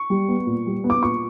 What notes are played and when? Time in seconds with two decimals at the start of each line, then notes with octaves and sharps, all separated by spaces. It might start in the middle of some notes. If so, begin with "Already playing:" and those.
Already playing: C#6
0.10 G3
0.28 B3
0.47 A#2
0.66 G3
0.84 B3
0.90 D6
1.03 A#2 C#6